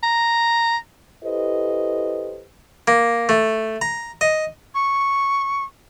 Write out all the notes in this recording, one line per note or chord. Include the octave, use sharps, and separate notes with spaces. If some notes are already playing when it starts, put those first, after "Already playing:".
A#5
E4 G4 A4 B4 C5 D#5
A#3
A3
A#5
D#5
C#6